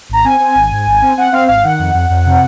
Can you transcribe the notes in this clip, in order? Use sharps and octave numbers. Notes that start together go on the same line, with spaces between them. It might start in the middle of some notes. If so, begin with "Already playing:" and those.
G#1 A#5
C4 G#5
C4
G#1
G#2
G#1
C4
C4 F#5
C4 F5
G#1 F5
D#3 F#5
F2
F2
F2
C3